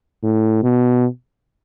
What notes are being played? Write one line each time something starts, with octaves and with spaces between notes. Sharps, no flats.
A2
B2